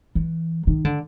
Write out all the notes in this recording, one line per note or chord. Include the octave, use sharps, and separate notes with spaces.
E3
D#3
D3